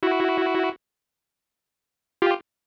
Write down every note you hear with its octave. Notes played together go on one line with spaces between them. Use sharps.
E4 F#4
F4 G4